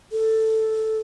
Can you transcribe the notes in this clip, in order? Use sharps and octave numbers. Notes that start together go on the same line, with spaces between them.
A4